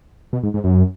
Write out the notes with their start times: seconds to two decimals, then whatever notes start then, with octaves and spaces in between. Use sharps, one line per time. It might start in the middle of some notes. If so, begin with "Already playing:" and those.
0.33 B2
0.43 G#2
0.54 G#2
0.64 F#2